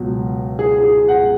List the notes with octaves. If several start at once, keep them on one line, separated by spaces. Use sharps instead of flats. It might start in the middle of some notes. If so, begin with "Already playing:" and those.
Already playing: C#2 B2 F#3
G#4
G#4
F#5